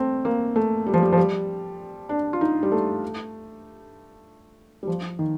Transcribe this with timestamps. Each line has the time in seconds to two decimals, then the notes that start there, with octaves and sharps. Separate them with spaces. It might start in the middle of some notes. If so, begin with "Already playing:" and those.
Already playing: A3 C4
0.25 A#3
0.56 A3
0.87 G3
0.94 F3
1.03 G3
1.13 F3
1.18 G3
2.09 D4
2.33 F4
2.41 D#4
2.63 G3
2.72 A3
4.83 G3
4.87 F3
5.19 D#3